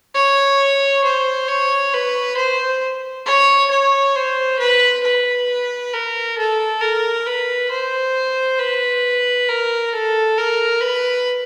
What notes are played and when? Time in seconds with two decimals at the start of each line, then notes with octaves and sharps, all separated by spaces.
0.15 C#5
1.04 C5
1.48 C#5
1.93 B4
2.37 C5
3.25 C#5
3.70 C#5
4.15 C5
4.59 B4
5.03 B4
5.93 A#4
6.37 A4
6.81 A#4
7.26 B4
7.71 C5
8.59 B4
9.48 A#4
9.93 A4
10.37 A#4
10.81 B4